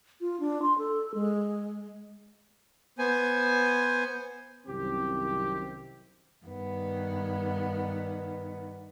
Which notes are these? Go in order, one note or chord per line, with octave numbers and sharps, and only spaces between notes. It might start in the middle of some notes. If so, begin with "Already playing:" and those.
F4
D4
C6
A4
G#3
B3 C5 G#5
C2 F#2 C3 D#3 C4 G4
G2 D#3 B3